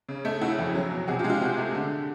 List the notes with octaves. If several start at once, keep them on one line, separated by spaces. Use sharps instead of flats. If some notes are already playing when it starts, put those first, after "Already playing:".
C#3
A3
C#3 E4 F#4
F2
F#3
B2
C3 F#4 G#4
F4 G4
G#3 G#4
F4 G4
C3 F#4 G#4
A3
D3